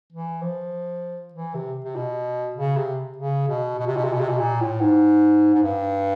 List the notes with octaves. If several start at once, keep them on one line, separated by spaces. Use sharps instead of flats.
E3
F3
E3
C3
C3
B2
C#3
C3
C#3
B2
B2
C3
B2
C3
B2
C3
B2
A#2
A2
G#2
G#2
G2